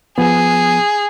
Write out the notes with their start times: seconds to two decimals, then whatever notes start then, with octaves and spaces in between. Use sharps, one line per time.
0.18 F3 B3 G#4